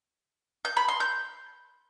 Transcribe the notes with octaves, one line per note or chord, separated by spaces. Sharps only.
G6
B5
C6
G6